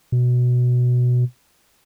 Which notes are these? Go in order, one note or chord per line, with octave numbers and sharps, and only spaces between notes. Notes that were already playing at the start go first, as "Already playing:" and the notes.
B2